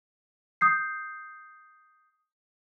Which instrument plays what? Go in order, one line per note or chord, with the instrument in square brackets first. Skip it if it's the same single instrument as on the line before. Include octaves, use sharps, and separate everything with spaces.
[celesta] D#6 G6 C7